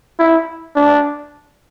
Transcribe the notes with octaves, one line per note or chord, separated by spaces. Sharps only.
E4
D4